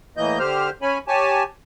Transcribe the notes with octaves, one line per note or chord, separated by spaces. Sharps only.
A2 E3 A#3 D#5 G6
D3 G4 C5 F6
C#4 C#5 G#5 B5
G4 C#5 G#5 A5